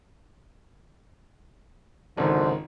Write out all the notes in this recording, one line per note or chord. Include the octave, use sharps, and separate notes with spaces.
G#1 C#2 F#2 D3 D#3 C5